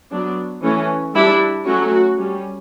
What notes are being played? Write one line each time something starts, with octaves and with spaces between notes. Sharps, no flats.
F#3 B3 D4
E3 A3 C#4
G3 D4 E4
F#3 A3 C#4 F#4
G3 C#4